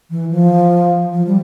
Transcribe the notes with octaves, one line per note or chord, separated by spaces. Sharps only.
E3
F3
F3
G3